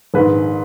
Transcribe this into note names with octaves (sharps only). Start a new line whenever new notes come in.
A#1 G#2 D#3 B4